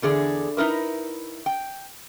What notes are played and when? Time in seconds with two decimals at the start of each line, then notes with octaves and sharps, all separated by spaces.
0.02 E2 D3 G#4 D5
0.57 D#4 E4 A#4 B4
1.46 G5